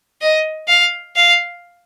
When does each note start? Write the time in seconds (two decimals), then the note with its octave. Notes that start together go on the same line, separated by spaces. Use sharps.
0.21 D#5
0.68 F5
1.16 F5